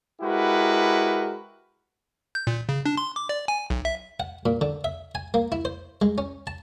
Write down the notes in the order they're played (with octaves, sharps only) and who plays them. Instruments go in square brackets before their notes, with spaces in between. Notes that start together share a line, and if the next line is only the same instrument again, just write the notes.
[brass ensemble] G#3 E4 F#4 G4 A#4 B4
[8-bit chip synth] G6
A#2
C#3
D4
C6
D6
D5
G#5
B1
E5
[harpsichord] F#5
A#2
D3
E5
G#5
A#3
E4
C5
G#3
C#4
A5